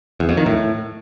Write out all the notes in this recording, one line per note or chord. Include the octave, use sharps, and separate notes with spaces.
E2
F2
D#3
A2